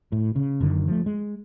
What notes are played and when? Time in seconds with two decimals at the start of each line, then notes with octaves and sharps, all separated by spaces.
0.12 A2
0.36 C#3
0.60 F#1 F#2 D3 D#3
0.87 F3 A3
1.06 G#3